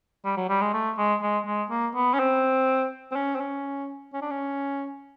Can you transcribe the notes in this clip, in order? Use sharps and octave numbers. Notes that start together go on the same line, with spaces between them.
G3
F#3
G3
G#3
A3
G#3
G#3
G#3
A#3
B3
C#4
C4
C4
C#4
C4
C#4
C#4
D4
C#4